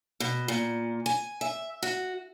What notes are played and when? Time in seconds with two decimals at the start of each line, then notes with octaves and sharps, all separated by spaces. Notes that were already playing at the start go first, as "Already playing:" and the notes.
0.20 B2
0.48 A#2
1.06 G#5
1.41 E5
1.83 F#4